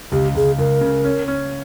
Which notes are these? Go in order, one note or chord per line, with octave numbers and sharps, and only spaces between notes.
C#2 G4
C#2 G#4
C#2 A#4
C#3
C#4
C#4